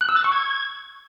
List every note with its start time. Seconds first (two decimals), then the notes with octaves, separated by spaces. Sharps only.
0.01 F#6
0.09 E6
0.16 A6
0.24 C#6
0.32 G#6